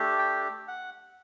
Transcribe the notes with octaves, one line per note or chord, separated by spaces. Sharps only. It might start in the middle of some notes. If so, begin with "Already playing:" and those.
Already playing: A3 D4 G4
G5
F#5